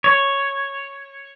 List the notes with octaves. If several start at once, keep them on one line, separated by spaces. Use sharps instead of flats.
C#5